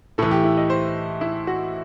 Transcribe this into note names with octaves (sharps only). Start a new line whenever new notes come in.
A2 E3 A4
G4
E4
D#5
C5
E4
F#4